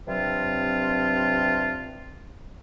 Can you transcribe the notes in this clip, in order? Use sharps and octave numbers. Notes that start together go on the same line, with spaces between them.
G2 C3 F#3 C4 D4 F4